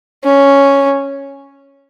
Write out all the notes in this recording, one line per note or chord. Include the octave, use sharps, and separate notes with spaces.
C#4